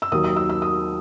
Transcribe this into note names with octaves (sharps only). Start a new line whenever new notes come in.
E6
D#2 D#3 F#3 D#6
D#6
E6
E6
D#6